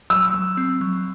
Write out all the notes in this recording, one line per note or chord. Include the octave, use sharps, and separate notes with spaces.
F#3 E6
F#3
C4
F#3